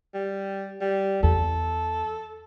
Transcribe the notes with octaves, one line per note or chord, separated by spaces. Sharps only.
G3
G3
E2 A4